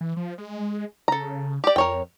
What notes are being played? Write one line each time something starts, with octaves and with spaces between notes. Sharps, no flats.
E3
F3
G#3
C#3 A4 A#5
G4 D5
F2 A#4 C#5 G5